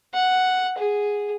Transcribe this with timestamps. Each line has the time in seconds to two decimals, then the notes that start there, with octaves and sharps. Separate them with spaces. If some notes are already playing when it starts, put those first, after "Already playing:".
0.14 F#5
0.78 G#4